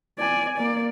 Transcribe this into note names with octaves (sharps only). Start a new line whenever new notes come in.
D5 G#5
A#3 D5